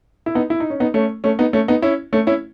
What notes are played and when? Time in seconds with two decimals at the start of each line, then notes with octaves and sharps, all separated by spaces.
0.26 E4
0.35 B3 D#4
0.50 E4
0.60 D#4
0.70 C#4
0.80 B3 D#4
0.94 A3 C#4
1.24 A3 C#4
1.39 B3 D#4
1.53 A3 C#4
1.68 B3 D#4
1.82 C#4 E4
2.13 A3 C#4
2.27 C#4 E4